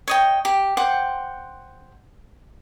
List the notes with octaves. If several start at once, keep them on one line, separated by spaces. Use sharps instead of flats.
C#5 D#5 G5
G4
C5 F#5 G5 D6